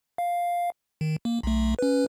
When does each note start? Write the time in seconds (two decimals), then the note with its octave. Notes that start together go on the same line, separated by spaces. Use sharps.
0.18 F5
1.01 D#3
1.25 A#3
1.43 B1 A3
1.79 C#4 B4